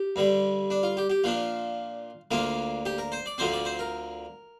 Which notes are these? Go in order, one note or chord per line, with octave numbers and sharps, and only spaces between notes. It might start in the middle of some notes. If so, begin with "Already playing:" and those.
Already playing: G4
G2 D3 G3
D4
F4
G4
G4
A#2 F3 D4 F4
D2 D3 A#3 D4 F4
G4
A#4
C5
D5
D2 D3 F3 C4 C5
D5
C5
A#4